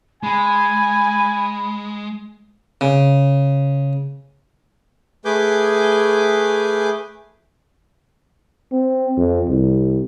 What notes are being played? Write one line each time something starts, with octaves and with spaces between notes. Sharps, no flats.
G#3 G#5 B5
C#3
A3 G#4 B4 G#5 D6 G6
C4
F2
C2